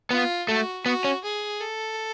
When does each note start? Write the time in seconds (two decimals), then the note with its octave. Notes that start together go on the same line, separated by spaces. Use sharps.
0.11 B3 F4
0.48 A3 F#4
0.85 B3 F#4
1.04 C#4
1.24 G#4
1.60 A4